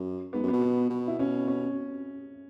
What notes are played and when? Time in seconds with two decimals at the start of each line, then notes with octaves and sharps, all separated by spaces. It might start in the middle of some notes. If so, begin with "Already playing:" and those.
Already playing: F#2
0.33 G#2 B3
0.43 F#2
0.48 B3
0.53 B2
0.61 B3
0.90 B2
1.08 E4
1.18 B2 C#4
1.48 C#4